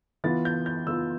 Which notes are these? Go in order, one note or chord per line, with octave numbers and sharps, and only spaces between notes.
E3 B3 F4 A6
G6
G6
E3 B3 F4 E6